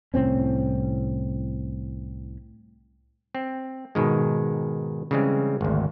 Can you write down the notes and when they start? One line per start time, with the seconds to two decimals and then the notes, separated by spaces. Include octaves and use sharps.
0.14 C2 A2 C4 C#4
3.35 C4
3.95 G#2 B2 D#3 G#3
5.11 C#3 E3 G3 G#3 C4
5.61 G#1 D2